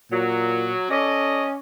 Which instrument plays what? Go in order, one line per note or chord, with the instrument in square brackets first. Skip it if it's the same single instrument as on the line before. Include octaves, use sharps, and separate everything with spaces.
[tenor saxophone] A#2 [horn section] F#3
[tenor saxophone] C#4 [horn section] A4 D5 D#5